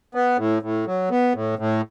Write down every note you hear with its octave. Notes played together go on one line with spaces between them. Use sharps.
B3
A2
A2
F#3
B3
A2
A2